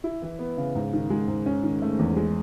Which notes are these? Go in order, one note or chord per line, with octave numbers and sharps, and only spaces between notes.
E4
E3
B3
C#3
G#2
D#3
G#3
G#2
C#4
D#3
A3
E2
G#3